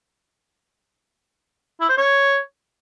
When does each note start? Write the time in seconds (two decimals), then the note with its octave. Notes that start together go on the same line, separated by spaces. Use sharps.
1.81 E4
1.89 C5
1.98 C#5